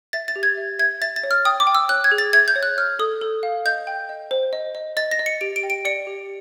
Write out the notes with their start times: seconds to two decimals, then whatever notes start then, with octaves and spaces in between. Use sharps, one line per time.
0.13 E5 A6
0.28 A6
0.36 G4
0.43 G#6
0.57 E5
0.79 E5 G#6
1.01 E5 A6
1.16 A6
1.23 C#5
1.31 F6
1.45 G5 D#6
1.60 D6
1.67 G5
1.75 E6
1.89 C#5 F#6
2.04 G#6
2.12 G#4
2.18 A6
2.33 E5 G#6
2.48 G6
2.56 C#5
2.63 F#6
2.77 C#5 F6
2.99 A4 D#6
3.21 A4
3.43 F5
3.65 D#5 G6
3.87 G5
4.09 D#5
4.31 C5
4.53 D#5
4.75 D#5
4.97 D#5 A6
5.11 A#6
5.19 D#5
5.26 C#7
5.41 G4 D7
5.56 D7
5.63 G5
5.70 D7
5.85 D5 C#7
6.07 G4